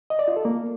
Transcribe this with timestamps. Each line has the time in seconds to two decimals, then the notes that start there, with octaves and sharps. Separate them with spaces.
0.10 D#5
0.19 D5
0.28 F4
0.36 A4
0.45 A#3